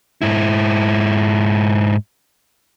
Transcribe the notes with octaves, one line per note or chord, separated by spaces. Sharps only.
G#2 E4